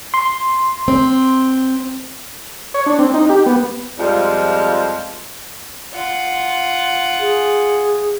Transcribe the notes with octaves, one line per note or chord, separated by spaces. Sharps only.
C6
C4
C#5
D4
C4
D#4
G4
B3
F2 F3 G3 G#3 F4
F4 F#5
G#4